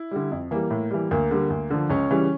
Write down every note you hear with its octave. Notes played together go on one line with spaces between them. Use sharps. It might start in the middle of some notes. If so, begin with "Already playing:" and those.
Already playing: E4
D3 G3
F2
E3 G3 A#3
A2
E3 G3
D2 A#3
D3 G3
D2
D3 F3
C#2 C#4
C#3 E3 G3